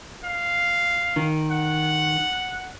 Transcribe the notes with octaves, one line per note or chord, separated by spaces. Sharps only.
F5
D#3
F#5